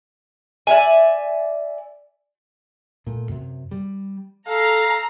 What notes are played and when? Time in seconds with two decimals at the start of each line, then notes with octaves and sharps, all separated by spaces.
0.67 D5 E5 G#5
3.07 A#2 A3
3.29 F#2 C3
3.71 G3
4.48 A4 F5 A#5